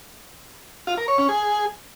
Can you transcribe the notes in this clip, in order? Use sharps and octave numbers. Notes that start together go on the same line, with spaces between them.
F4
A#4
C#5
C#4
G#4